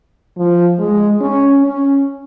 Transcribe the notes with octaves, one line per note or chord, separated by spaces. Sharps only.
F3
G#3
C#4
C#4